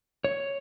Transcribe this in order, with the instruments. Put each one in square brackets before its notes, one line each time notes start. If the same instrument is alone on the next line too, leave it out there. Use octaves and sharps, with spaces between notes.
[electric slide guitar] C#5